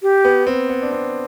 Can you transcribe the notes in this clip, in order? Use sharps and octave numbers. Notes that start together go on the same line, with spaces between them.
G4
B3
C4
B3
D4
C4